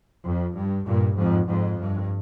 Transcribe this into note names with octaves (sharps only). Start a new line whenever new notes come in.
F2
G2
G2 A#2
F2 G#2
F2 G#2
G2